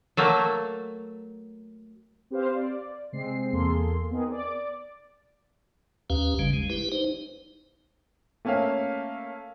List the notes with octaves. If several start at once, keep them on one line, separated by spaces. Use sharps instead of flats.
F#3 A3 A#3
C4 G4 B4 C5 F5
D5
C3 G#3 C4 C7
E2 A#3 G#4 A4 C6
B3 C4 D#4 G#4 A#4
D5 D6
D#2 C#4 G4 B4 F5
G#1 C#3 G3
G#3
E4 G4 B4
D#4 C5
A3 A#3 C#4 E5 F5